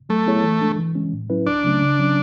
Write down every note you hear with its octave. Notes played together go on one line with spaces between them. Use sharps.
F#3 A3
B3 E4 G#4 C#5
E3
G#3 D4
E3
G#3 C#4
A2
F#3 C#4 E4 B4
C#2 D4
C#3 F#3 A3 C#4
C#3
F#3 C#4